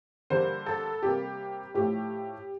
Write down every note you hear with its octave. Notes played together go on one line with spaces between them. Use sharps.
D3 G3 A#3 C5
A4
C3 G3 A#3 G4
A2 F3 A3 G4